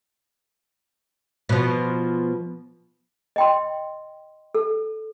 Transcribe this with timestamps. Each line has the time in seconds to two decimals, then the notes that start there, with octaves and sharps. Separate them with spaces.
1.49 B2 F3
3.36 D#5 G5 C6
4.55 A4